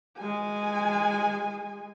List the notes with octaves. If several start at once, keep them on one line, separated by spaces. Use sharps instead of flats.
G#3 G#5